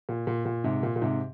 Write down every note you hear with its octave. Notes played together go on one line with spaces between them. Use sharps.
A#2
A#2
A#2
G#2 C3
A#2
A#2
G#2 C3